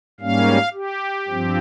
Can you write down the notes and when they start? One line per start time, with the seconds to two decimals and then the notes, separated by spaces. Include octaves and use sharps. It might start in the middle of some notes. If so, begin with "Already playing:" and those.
0.20 G#2 G3 A#3 C#4 F5
0.74 G4
1.28 G2 F3 C4